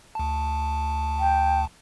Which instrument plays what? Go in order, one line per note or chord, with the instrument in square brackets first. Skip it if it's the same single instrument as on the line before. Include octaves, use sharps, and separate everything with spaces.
[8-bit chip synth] D2 A5
[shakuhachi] G5